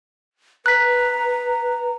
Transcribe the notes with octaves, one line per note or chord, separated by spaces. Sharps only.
B4 A#5 F#6 B6